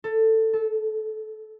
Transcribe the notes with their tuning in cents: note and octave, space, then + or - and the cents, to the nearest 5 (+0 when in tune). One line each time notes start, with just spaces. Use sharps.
A4 +15
A4 -20